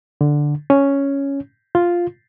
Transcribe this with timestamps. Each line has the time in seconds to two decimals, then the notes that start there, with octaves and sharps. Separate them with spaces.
0.21 D3
0.70 C#4
1.75 F4